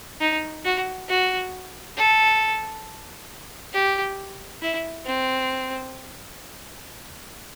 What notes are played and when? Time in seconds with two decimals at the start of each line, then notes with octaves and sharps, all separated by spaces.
0.20 D#4
0.65 F#4
1.09 F#4
1.97 A4
3.73 G4
4.62 E4
5.06 C4